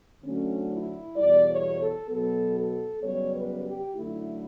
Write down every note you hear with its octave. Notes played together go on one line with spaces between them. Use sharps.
D2 D3 F#3 A3 C#4
E4
E2 B2 G3 D5
C#5
A4
B2 F#3 B3 A4
A4
F#2 C#3 G3 B3 C#5
B4
G4
F#2 D3 A3 E4